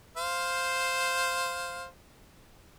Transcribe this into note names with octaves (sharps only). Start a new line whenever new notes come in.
C5 F5